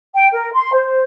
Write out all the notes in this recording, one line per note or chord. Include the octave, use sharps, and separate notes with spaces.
G5
A#4
C6
C5